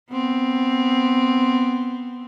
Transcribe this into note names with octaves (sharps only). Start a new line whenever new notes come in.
B3 C4